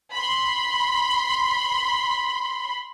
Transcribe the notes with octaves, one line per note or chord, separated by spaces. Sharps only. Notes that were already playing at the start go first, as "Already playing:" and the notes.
B5 C6